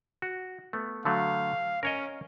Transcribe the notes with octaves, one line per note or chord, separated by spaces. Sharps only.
F#4
A3 B3
D3 F#3 A3 F5
C#4 A#4 C#5 D#5